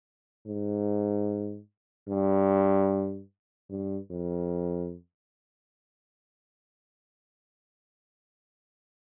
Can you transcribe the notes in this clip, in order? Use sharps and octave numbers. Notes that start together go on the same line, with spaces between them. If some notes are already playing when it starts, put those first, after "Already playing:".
G#2
G2
G2
F2